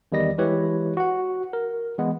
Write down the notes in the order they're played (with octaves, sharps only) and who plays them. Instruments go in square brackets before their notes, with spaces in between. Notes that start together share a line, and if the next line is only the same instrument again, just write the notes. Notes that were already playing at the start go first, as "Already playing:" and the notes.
[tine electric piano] E2 D#3 G3 D#5 A#6
E3 G#3 E4 G4 B4 C#5
F#4 F#5
A#4
E3 G#3 B3